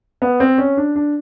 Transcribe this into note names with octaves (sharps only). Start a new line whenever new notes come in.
B3
C4
C#4
D4
D4